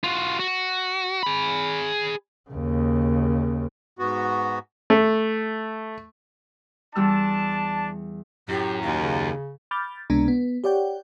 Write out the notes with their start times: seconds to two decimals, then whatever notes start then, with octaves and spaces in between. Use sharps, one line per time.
0.04 F4 F#4
0.40 F#4
1.23 G#4 B5
2.50 D#2 C#3
3.99 G#2 B3 F#4
4.90 A3
6.95 E2 G3 D4 A5 E6
8.49 F#2 A2 G4
8.82 D#2 F5
9.02 C#3
9.71 B5 D6 F6 G6 A6
10.10 C#2 C3 G#3 B3 D4 A#5
10.28 B3
10.64 G4 C#5 D5 F#5 G5